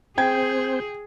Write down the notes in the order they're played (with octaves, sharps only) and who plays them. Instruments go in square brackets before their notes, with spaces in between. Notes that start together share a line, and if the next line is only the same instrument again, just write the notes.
[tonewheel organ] C4 C5 [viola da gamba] G#4 [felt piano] G5 G#6